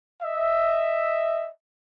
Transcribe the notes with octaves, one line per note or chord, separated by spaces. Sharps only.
D#5 E5